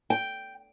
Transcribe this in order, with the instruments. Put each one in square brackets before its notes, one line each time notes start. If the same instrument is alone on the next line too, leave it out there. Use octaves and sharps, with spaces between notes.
[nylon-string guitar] G5